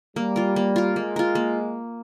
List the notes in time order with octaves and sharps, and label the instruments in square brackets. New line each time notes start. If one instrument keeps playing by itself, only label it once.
[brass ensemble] G3 [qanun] A#3
[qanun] F4 A#4
A#3
F4 A#4
[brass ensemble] G#3 [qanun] A#3
[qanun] F4 A#4
A#3